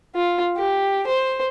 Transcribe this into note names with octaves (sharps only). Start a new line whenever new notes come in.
F4
G4
C5